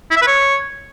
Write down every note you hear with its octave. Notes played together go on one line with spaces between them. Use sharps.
E4
E5
B4
C#5